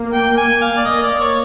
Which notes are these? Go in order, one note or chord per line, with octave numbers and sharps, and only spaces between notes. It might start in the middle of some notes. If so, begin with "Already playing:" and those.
Already playing: A#3
G5
G#5
F5
D5
A#3 D#5
D5
C#5